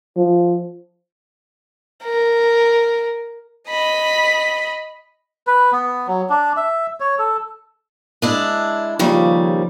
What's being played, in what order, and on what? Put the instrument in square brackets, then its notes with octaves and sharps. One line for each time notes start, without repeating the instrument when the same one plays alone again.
[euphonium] F3
[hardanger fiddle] A#4
[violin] D#5 B5
[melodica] B4
B3
F#3
D4
E5
C#5
A4
[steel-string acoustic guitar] G#3 D4 E4
[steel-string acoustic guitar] D#2 C#3 G3 [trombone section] F3